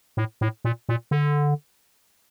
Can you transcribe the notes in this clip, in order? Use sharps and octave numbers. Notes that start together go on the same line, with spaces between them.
A2
A2
A#2
A#2
D3